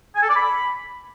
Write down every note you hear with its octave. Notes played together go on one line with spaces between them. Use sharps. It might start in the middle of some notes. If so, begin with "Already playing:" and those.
G#5
A4
D5
B5